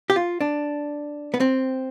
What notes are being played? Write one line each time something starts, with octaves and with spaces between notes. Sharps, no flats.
G4
F4
D4
B3
C4